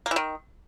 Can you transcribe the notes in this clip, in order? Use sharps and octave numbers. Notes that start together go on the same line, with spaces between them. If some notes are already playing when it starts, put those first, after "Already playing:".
A#3
E3
D#3